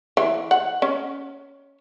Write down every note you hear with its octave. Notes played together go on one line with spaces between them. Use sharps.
E3
F#5
C#4